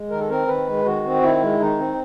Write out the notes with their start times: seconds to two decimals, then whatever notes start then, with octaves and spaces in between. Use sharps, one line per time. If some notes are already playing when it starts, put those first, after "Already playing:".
Already playing: G#3
0.10 D#3 A#4
0.20 A4
0.29 C4 A#4
0.48 D#3 B4
0.67 G#3
0.85 D#3 F#4
1.04 C4
1.22 D#3 E4
1.41 G#3
1.60 D#3 D#4
1.79 C4